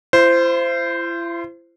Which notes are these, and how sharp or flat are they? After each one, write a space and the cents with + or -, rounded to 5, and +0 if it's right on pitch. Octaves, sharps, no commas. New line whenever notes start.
E4 +45 C5 -10